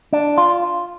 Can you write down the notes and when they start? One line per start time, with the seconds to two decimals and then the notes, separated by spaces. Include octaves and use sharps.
0.13 D4
0.38 F4